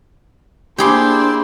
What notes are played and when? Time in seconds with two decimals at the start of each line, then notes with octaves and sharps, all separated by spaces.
0.78 A#3 D4 E4 G4 G#4 C5 G5 C6